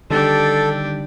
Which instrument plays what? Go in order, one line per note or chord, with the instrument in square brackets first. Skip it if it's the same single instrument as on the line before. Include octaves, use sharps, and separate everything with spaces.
[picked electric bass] D3 D#3 G3 [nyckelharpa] D4 G4 [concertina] A4